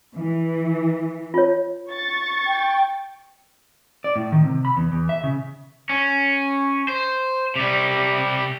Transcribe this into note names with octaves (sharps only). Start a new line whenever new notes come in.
E3
F4 C#5
C#6 A6
G5
D5
A2
D#3
C3
B5
E2
E2
E5
C#3
C#4
C5
C3 G3